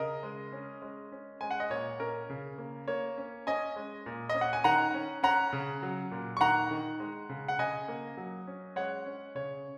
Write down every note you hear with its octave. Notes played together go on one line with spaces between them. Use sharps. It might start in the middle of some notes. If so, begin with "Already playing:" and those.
Already playing: C#3 A#4 D#5
G#3
C#4
G#3
C#4
G#3 G#5
F#5
D#5
A#2 C#5
C#4 A#4
C#3
A#3
A#3 C#5
C#4
C#4 D#5 G#5
G#3
A#2
D#5
C#4
F#5
G#5
D#3 F#5 A#5
C#4
C#4 F#5 A#5
C#3
F#3
A#2
C#6
D#3 F#5 A#5
D#3
G#3
C#3
F#5
C#3 D#5 G#5
A#3
F#3
C#4
G#3 C#5 F#5
C#4
C#3 C#5